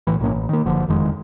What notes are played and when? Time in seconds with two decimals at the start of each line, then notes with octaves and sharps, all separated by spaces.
0.07 B1 A2 E3
0.20 B1 A2 A#3 C#4
0.31 A1
0.49 D#3 A#3
0.66 F#1 D3 F3
0.88 F#1 F2 D#3 G#3